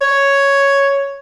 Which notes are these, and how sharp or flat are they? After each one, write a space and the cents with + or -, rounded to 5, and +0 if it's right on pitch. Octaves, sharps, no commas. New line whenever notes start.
C#5 +0